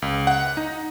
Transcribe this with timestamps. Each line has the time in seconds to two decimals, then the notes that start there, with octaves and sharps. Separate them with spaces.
0.02 C#2
0.27 F#5
0.57 D#4